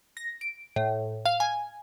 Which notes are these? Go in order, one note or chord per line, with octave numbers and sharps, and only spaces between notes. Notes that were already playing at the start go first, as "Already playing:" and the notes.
A#6
D7
A2
F5
G#5